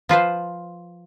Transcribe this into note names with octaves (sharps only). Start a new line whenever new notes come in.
F3 F4 B4 C5